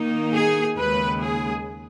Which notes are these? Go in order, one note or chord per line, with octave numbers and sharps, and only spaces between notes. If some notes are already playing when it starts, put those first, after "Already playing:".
Already playing: D#3 A#3 D#4
G#4
D#2 C#3 G#3 B4
G#4